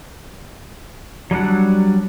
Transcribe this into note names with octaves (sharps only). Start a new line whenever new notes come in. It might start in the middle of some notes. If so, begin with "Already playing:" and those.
F#3 G3 D4 F#5